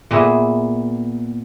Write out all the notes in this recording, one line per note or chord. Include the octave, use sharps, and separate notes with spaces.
A#2 B3 G#4 E5